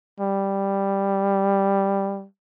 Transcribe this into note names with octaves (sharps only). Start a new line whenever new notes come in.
G3